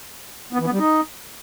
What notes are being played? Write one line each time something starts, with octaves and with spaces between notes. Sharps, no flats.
B3
E3
B3
G3
D#4